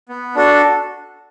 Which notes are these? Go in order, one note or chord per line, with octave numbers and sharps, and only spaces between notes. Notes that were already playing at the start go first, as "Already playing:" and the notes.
B3
D4 F#4 A4